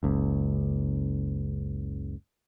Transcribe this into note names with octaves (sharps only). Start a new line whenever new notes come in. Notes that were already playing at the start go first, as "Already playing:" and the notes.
F#1 C#2